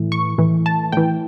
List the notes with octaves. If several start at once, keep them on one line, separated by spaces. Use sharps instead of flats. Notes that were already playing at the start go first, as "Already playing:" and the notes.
Already playing: A2 E3
C#6
A2 E3
A5
A2 E3 G5